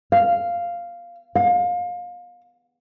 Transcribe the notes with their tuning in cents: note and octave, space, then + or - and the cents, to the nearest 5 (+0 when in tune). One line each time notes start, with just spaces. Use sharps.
F5 -5
F5 +30